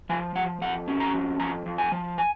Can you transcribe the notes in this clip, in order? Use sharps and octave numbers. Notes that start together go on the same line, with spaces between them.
F3 G#5
F3 F#5
F2 F#5
C#4
A#5
F2
F2 A#5
F2
G#5
F3
G#5